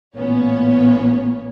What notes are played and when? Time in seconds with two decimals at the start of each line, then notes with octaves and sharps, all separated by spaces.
0.15 A1 A#2 B3 C#4 C#5